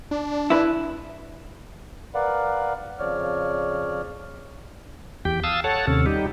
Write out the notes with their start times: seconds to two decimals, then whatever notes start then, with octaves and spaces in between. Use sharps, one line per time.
0.11 D4
0.50 E4 B4
2.15 A#4 B4 D5 F5 F#5 B5
2.99 F2 C#3 F3 C#5 D5 F6
5.25 E2 G4 G5
5.44 F5 A5 D#6 E6
5.64 A4 C#5 F#5 A5
5.87 D#2 C3 C#4 A4
6.06 G3 D#4 G4